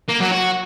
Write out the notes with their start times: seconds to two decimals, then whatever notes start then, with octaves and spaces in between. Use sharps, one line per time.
0.09 A#3
0.21 F#3
0.32 F#4